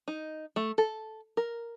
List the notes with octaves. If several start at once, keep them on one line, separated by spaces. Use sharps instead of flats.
D#4
A3
A4
A#4